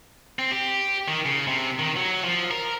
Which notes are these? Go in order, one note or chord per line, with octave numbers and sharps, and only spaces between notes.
C4
G4
D#3
C#3
C3
D#3
F#3
F3
A#4